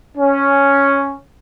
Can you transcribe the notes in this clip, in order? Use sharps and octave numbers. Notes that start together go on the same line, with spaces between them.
C#4